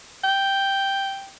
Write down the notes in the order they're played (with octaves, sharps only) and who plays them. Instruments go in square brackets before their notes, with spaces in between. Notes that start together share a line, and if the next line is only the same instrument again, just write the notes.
[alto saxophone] G5